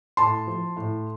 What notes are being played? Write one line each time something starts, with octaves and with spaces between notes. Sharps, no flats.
A2 A5 C6
F3
A2